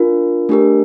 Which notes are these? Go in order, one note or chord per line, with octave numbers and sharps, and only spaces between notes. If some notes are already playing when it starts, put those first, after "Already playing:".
Already playing: D4 F4 A#4
A3 D4 G4 A#4